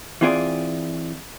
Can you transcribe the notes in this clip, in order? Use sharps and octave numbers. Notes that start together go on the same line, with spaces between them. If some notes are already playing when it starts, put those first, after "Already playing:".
E3 C4 F4 G#4 D5